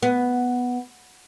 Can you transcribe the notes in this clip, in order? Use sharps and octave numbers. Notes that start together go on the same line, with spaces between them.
B3